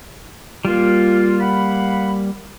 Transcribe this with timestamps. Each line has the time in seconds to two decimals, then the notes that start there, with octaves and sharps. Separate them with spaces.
0.65 G3 A#3 F4
1.40 F5 F#5 B5